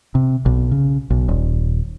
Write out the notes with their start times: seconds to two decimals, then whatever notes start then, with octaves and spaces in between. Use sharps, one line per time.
0.15 C3
0.46 B1
0.72 C#3
1.10 B1
1.29 D#1